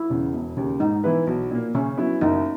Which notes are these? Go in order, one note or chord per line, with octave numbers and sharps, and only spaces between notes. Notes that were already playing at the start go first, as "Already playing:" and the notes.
Already playing: E4
E2 C#3
E1
D#2 C#3
G#2 D#4
E3 B3 E4 B4
B1
A#2 A#3
C#3 C#4
F#3 B3 E4
F#1 D#4